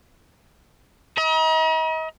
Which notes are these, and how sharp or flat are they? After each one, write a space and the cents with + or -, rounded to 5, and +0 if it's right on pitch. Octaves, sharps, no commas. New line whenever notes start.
D#5 +40 A#5 +45